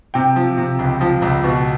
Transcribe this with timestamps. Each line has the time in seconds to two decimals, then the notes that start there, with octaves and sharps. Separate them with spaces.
0.14 C3 G5
0.36 F3
0.58 C3
0.79 C#2
1.01 F3
1.22 C#2
1.44 B2